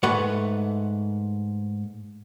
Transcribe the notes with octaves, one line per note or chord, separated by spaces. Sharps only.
G#2 A3 B4 F#5